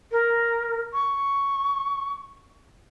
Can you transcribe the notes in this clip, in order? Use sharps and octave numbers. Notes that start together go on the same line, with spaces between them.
A#4
C#6